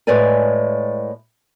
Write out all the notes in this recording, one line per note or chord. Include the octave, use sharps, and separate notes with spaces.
A2 G#3 B4 D5 G#5